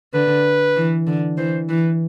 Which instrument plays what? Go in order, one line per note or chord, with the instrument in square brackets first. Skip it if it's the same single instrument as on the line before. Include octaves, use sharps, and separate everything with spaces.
[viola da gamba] D3 [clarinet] B4
[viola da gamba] E3
D3
[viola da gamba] E3 [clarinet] C5
[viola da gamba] E3 [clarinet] B4